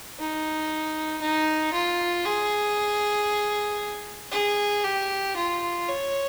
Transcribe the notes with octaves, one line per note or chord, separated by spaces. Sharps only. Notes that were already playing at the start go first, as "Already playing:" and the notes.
D#4
D#4
F4
G#4
G#4
G4
F4
C#5